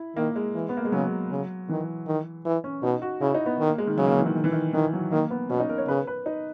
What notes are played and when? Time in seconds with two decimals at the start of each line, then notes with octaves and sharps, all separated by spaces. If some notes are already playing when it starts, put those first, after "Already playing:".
Already playing: E4
0.16 D#3 A#3
0.36 G#3
0.54 E3
0.69 B3
0.77 A#3
0.85 G#3
0.92 C#3 F#3
1.30 C#3
1.69 D#3 E3
2.07 D#3
2.45 E3
2.64 C#4
2.83 B2 D#4
3.02 F#4
3.21 C#3 E4
3.34 D#4
3.46 B3
3.60 D#3
3.69 A#3
3.78 G#3
3.87 D#3
3.97 C#3 F#3
4.07 A#3
4.17 E3
4.26 D#3
4.36 D#3
4.44 E3
4.52 D#3
4.73 D#3 E3
4.93 F#3
5.11 D#3 A#3
5.30 B3
5.49 B2 C#4
5.60 D#4
5.69 A#4
5.78 C#5
5.88 C#3 B4
6.07 B4
6.26 D#4